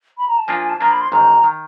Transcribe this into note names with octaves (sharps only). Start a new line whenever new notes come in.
B5
A#5
A5
F3 A#3 D4 F4 G#5
G#5
A5
F3 A#3 D4 F4 A#5
B5
C6
A1 G#2 D#3 A#5
D#3